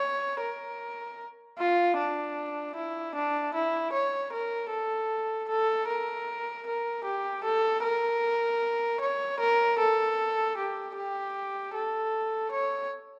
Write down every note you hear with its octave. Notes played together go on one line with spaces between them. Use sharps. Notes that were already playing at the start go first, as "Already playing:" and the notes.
Already playing: C#5
A#4
F4
D4
E4
D4
E4
C#5
A#4
A4
A4
A#4
A#4
G4
A4
A#4
C#5
A#4
A4
G4
G4
A4
C#5